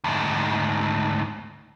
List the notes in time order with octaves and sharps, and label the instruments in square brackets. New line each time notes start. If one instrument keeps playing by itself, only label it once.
[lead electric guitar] D2 G#2